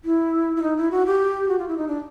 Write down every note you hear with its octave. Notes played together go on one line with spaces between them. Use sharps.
E4
E4
D#4
E4
F#4
G4
F#4
F4
E4
D#4
D4